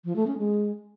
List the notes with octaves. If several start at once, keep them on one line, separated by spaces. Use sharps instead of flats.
F3
A3
C#4
G#3